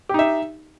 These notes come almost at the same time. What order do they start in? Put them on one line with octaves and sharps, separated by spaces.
G4 D#4 E5